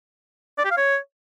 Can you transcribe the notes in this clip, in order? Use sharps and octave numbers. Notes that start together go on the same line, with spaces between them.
D5
G4
F5
C#5